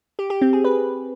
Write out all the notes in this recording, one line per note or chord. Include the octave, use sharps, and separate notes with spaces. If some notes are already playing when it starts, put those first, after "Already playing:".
G4
G4
C4
G#4
B4